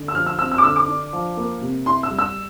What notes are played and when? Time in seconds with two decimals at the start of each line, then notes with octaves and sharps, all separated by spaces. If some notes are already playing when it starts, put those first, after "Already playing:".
Already playing: D3
0.08 E6
0.14 F3 F6
0.26 E6
0.39 C4 E6
0.51 E6
0.58 D6
0.63 D3 E6
0.76 D6
0.88 D4
1.13 F3
1.37 A#3
1.61 C3
1.86 E4 C6
2.03 E6
2.10 G3
2.19 E6